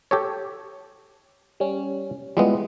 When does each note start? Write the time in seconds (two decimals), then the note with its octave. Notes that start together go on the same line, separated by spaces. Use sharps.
0.11 G4 A4 C#5
1.60 G3 C#4
2.37 G3 G#3 B3 E4 F4